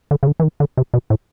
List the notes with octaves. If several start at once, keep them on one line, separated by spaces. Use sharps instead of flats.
D3
C#3
D3
E3
D#3
D3
C3
B2
A2